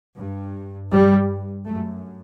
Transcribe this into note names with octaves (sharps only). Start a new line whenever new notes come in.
G2
G2 G3
F#2 A3